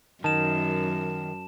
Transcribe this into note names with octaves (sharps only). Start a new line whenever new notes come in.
F#2 D#3 A5 E7